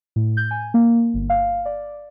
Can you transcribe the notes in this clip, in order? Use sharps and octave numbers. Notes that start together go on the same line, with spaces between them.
A2
G6
G#5
A#3
G1
F5
D5